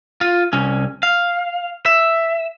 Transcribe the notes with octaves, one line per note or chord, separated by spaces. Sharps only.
F4
C2 C#4
F5
E5